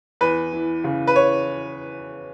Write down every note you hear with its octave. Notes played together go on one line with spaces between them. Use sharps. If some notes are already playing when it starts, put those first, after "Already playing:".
E2 B4
E3
C#3
B4
C#5